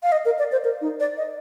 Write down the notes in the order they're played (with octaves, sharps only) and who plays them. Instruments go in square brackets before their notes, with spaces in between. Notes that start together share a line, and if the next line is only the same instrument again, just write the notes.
[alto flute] F5
D#5
A#4
D5
C5
A#4
D#4
D5
D#5